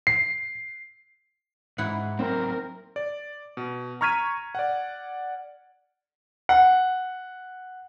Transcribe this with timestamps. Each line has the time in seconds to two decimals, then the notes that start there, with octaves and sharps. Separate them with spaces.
0.07 C7
1.78 G#2 E4 F#5
2.19 F#3 A#3 C4 D#4 A#4
2.96 D5
3.57 B2
4.01 A#5 C#6 F6 G#6 B6 D#7
4.55 D5 F#5
6.49 F#5